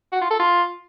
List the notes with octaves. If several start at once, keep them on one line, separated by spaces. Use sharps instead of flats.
F#4
F4
A4
F4